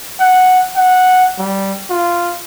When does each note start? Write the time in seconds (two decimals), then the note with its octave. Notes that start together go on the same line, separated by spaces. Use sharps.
0.20 F#5
0.76 F#5
1.38 G3
1.90 F4